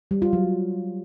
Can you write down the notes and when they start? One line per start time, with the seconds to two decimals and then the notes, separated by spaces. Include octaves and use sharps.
0.11 G3
0.22 F4
0.33 F#3